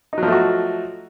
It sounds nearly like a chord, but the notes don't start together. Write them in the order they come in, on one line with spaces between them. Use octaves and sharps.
D#4 F#3 F3 A3 F#4